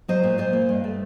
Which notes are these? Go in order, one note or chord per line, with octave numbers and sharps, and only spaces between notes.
F#3 C5 D#5
A#2
A#2 C5 D#5
A#3
G2
A3